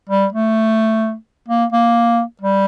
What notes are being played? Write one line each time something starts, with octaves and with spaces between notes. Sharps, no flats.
G3
A3
A#3
A#3
G3